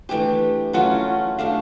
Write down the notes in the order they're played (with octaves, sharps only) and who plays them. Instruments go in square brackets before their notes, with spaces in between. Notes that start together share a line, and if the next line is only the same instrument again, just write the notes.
[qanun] E3 A3 D4 G4 [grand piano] G5
[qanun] F#3 A3 C#4 F4 [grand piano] F#5
[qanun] A3 D4 G4 [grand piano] F5